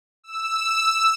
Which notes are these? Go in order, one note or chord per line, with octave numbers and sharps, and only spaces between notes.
E6